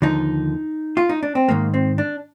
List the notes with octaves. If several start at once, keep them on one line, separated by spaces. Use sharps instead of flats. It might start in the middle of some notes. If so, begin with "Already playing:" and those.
D#2 D3 F3 D#4
F4
D#4
D4
C4
G#2 D#3 G#3 A#3
C4
D4